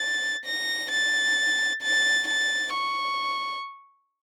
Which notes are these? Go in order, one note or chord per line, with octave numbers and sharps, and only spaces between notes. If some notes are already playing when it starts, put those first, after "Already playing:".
Already playing: A6
A#6
A6
A6
A6
C#6